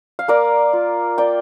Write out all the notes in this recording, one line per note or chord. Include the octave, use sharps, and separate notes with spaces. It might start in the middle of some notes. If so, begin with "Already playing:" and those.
F5
A#3 A#4 D5
F4
A#3 D5 G5